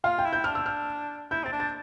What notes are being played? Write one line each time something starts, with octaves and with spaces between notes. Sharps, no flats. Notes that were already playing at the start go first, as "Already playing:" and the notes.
F4 F5
G5
E4
G6
D4 F6
E6
F6
E4 G6
C4 A6
D4
A6